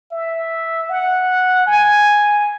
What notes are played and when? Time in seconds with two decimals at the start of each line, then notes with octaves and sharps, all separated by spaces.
0.12 E5
0.90 F#5
1.67 G#5